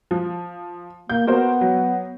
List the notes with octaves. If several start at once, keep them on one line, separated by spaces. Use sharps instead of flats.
F3
A#3 G6
B3 F#4 A#4 C5
F#3